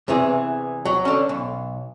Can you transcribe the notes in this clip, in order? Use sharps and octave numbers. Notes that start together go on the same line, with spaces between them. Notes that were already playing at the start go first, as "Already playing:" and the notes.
E2 C3 E3 G#4
F#3
D3 C#4
B1